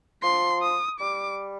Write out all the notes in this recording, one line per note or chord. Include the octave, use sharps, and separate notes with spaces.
F3 C6
D#6
G3 D6